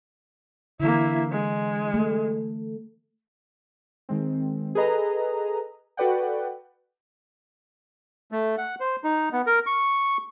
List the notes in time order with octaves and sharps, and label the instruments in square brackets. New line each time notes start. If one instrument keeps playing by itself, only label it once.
[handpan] D3 E3 [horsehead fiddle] A#3 E4
[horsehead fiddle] G#3
[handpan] A3
[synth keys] D#3 G#3 C4
G#4 A4 B4 D#5 A#5
F#4 A4 B4 D5 F#5 G5
[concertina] A3
F#5
C5
D#4
B3
A#4
C#6